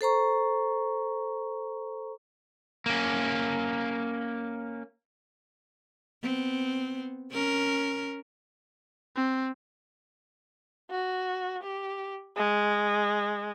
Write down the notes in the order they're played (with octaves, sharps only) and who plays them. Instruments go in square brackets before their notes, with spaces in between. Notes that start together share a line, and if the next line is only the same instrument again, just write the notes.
[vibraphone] A4 C5 A#5 C#6
[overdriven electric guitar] A#3 C#4
[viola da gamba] B3 C4
C#4 A#4
[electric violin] C4
[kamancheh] F#4
G4
G#3